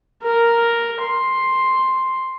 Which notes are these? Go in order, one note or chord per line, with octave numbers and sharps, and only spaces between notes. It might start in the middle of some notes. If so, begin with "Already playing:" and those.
A#4
C6